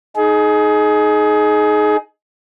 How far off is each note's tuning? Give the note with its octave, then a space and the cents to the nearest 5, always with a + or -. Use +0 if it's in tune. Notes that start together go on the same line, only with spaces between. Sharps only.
D#4 +0 G#4 +25